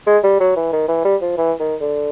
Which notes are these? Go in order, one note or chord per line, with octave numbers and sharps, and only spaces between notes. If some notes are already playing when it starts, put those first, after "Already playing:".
G#3
G3
F#3
E3
D#3
E3
G3
F3
E3
D#3
D3